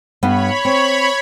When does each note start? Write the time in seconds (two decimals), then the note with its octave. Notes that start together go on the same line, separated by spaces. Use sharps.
0.23 G2 B3 C#5 B5
0.65 C4